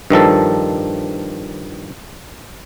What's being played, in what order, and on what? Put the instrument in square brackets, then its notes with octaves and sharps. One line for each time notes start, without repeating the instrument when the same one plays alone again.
[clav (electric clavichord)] G2 D#3 F3 A4